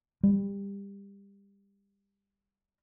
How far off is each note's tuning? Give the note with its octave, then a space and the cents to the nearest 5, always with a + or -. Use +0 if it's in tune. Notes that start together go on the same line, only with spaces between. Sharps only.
G3 +25